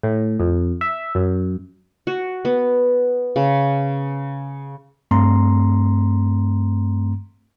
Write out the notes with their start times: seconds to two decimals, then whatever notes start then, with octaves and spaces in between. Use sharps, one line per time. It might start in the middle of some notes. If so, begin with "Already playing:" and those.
0.03 A2
0.40 F2
0.81 E5
1.15 F#2
2.07 F#4
2.45 B3
3.36 C#3
5.11 G2 A3 C4 A#5 C6